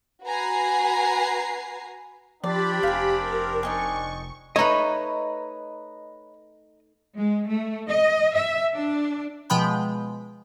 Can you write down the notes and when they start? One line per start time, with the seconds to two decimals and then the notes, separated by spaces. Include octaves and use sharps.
0.23 F#4 B4 G#5 A#5 C7
2.44 F3 C4 D4 G4 D5 B5
2.83 F1 F5 G#5
3.19 A#4
3.63 D#4 D#5 G#5 C#6
4.56 A3 D#4 B4 C#5 D#5 A#5
7.17 G#3
7.49 A3
7.91 D#5
8.35 E5
8.76 D4
9.50 B2 F3 G#3 G5 B5 G6